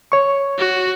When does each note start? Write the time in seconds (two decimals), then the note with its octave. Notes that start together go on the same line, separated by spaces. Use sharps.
0.12 C#5 C#6
0.58 F#4